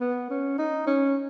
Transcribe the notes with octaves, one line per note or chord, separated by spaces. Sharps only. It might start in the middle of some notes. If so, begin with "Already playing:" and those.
B3
C#4
D#4
C#4